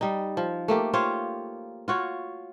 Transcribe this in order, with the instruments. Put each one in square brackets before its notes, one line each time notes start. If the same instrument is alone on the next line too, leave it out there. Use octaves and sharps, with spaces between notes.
[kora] G3 D#4
F3
A3 A#3 G4
F4 G4 C5 C#5
F4 F#4 C#5